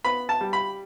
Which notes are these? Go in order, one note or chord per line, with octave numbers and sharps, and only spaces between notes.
B3 B5
A5
G3
B5